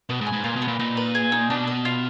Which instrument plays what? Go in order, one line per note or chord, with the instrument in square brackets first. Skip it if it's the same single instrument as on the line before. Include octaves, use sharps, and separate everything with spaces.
[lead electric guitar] B2 [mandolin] B4
[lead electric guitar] G#2
[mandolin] G#5
[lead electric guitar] G#2
[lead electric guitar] A#2 [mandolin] F4
[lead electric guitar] B2
[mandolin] B3
[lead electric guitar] A#2
[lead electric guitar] A#2 [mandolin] D#4
[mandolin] B4
G#4
D#4
[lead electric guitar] B2 [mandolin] D4
[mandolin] D#5
F4